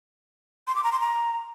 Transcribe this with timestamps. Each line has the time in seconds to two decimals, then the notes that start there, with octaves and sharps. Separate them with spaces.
0.67 C6
0.76 D6
0.84 A#5
0.92 C6
1.00 A#5